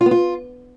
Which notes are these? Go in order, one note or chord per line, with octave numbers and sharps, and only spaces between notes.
F4
B3
F4